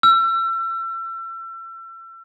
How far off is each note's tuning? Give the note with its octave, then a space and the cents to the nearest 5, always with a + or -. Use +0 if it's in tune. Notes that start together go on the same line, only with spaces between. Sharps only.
E6 +35